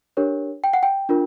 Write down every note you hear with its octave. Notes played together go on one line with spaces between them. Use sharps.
D4 G4 A#4 C#5
G5
F#5
G5
D4 F4 A#4